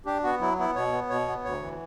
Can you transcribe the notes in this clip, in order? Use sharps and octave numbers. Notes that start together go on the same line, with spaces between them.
D4 G4
B3 F#4
F#3 E4
B3 E4
B2 C#5
B3
B2 C#5
B3
D2 C#5
E3